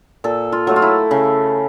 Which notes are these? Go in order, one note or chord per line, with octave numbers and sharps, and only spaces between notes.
A#2 A4
F4
F#3 A3
F4
E4
C#3